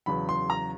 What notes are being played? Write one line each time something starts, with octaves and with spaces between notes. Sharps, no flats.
E2 C#3 F#3 B5
C6
A#5